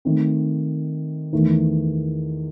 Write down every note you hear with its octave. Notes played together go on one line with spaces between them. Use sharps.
D#3 A3 C4
E2 D#3 A3